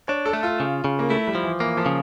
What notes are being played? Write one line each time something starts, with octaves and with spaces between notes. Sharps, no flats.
D4 C#5
A4
A3
F4
C#3
C#3
A#3
A3 E4
G3
F3
E3
E3 A#3
F3
C#3